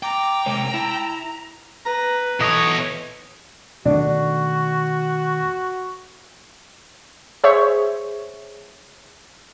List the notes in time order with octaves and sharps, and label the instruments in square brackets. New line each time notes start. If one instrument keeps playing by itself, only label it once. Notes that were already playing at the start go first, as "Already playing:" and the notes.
[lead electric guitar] G5 [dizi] A#5 [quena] D6
[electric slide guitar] C3 G#3 C#5
[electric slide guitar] E4 [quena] A5
[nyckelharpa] B4 [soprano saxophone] A#5
[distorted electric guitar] B2 C#5 [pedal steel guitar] E3 D#5 [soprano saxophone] A4
[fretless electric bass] B2 D#3 A3 [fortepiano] D4 [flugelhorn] F#4
[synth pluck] G#4 C5 C#5 E5